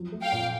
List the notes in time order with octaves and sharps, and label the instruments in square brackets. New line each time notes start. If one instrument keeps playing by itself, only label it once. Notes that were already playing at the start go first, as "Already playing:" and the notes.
Already playing: [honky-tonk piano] F3 F#3
A3
[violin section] F5 G5
[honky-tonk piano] A#2